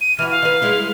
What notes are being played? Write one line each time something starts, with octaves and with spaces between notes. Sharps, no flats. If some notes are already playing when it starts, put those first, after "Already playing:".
D#7
E3 F#4 F6
F5
D#3 B4
G3 G#3 E4